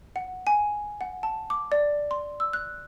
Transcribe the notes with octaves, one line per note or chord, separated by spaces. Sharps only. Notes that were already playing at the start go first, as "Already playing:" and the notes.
F#5
G#5
F#5
A5
D6
D5
C6
E6
F#6